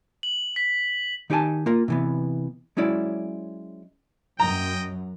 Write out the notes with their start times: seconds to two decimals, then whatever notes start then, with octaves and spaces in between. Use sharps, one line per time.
0.23 F#7
0.56 B6
1.30 D#3 D#4 G4 C5 G#5 A5
1.66 A#3 F4 A#4
1.88 C3 E3 B3
2.77 F#3 G#3 C#4 E4 D5
4.40 F#2 D#5 G5 A#5